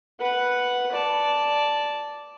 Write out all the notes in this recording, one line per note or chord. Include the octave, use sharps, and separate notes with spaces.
B4 F#5
D5 A5